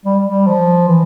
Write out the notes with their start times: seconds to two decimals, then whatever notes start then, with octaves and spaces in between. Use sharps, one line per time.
0.05 G3
0.28 G3
0.47 F3
0.88 E3